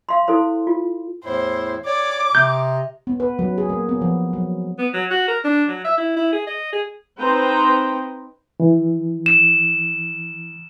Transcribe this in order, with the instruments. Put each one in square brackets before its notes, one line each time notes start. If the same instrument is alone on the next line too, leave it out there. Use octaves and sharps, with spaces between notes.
[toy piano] F5 C6
E4 A4 C5 C6
F4
[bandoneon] E2 A2 E4 [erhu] C5
[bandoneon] C#5 D5 [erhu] D6
[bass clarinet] C3 [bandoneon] D#5 A#5 [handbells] G6
[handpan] B3
B4
F#3
G#4
A#3
B3
F3
F#3
[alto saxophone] B3
F#3
F#4
A#4
D4
F#3
E5
E4
E4
G#4
D#5
G#4
[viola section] C4 D#4 B4 C5 G5 A#5
[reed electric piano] E3
[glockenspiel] E7